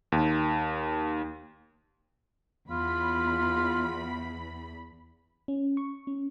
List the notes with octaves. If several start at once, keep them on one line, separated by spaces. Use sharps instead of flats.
D#2
E2 F4 B5
C#4
C#6
C#4